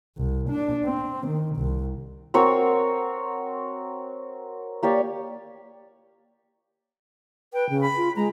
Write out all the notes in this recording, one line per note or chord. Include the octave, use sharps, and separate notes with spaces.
C2
D4
C4
D#3
C2
C4 F#4 A#4 C#5
A#3 G4 C#5 D5
B4 G5
C#3
B5
F4
G#3 A#5